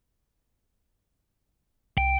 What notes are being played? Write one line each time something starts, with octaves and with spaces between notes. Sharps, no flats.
C2 G5